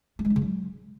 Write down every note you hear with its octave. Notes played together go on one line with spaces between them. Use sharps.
A3
G#3
D#4
C#3
F#3